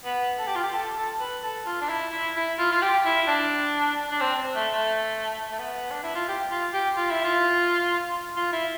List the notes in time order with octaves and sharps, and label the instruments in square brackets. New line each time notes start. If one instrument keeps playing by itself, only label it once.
[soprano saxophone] B3
A4
G4
F4
G4
A4
A4
B4
A4
F4
D4
E4
E4
E4
F4
F4
G4
E4
D4
D4
C4
A3
A3
A3
B3
D4
E4
F4
G4
F4
G4
F4
E4
F4
F4
E4